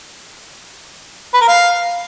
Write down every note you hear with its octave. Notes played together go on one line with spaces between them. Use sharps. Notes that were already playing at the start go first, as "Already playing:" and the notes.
B4
A#4
F5